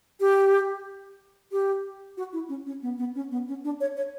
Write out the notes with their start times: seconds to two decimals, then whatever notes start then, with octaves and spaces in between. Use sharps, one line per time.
0.20 G4
1.52 G4
2.17 F#4
2.33 E4
2.49 C#4
2.66 C#4
2.82 B3
2.98 B3
3.15 C#4
3.31 B3
3.48 C#4
3.65 D4
3.81 C#5
3.97 C#5